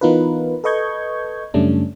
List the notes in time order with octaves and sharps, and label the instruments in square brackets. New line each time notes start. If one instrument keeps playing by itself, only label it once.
[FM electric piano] E3 B3 D#4 F4 A#4 B4
A4 B4 D#5 C#6 G6 G#6
F#2 C#3 G3 A3 C#4 D4